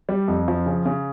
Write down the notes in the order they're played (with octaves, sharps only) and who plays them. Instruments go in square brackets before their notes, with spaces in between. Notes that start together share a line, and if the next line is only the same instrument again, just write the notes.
[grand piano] G3
F2
F3
C#3
C#3